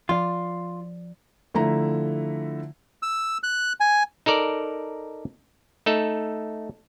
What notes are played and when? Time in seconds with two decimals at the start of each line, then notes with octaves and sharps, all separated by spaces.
0.09 F3 F4 D5
1.54 D3 F3 A3 E4 E5 A#5
3.03 E6
3.43 F#6
3.80 G#5
4.26 D#4 A4 A#4 D5
5.86 A3 D#4 A4